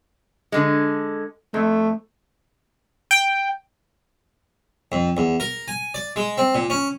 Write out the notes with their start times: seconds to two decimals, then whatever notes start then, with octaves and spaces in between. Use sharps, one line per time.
0.52 D3 G#3
1.54 F2 A3
3.11 G5
4.92 F2
5.17 E2
5.40 A#4
5.68 G#5
5.94 D5
6.16 G#3
6.38 C4
6.55 A#2
6.70 C#4